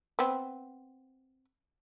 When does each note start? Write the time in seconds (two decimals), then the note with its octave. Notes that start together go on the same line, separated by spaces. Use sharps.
0.19 B3 C4